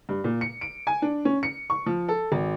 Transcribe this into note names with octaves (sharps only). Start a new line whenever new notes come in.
G2
A#2
C#7
D7
G#5
D4
C#4
C#7
C#6
F3
A4
G#1